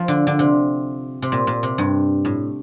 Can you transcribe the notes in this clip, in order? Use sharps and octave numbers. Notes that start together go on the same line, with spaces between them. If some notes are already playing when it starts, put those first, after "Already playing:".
Already playing: F3
D3
D3
C3
C3
A#2
A#2
C3
G2
A2